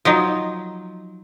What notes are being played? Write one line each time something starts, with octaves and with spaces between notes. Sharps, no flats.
F3 F#3 D#4